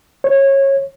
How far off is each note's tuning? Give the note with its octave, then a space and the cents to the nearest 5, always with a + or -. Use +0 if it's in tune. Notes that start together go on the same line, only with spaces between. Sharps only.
C#5 -20